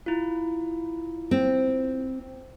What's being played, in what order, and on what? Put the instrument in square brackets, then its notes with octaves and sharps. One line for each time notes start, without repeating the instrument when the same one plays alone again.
[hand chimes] E4 F4
[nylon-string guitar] C4